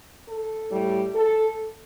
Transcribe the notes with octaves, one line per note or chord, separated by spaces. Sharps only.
A4
A2 G3
A4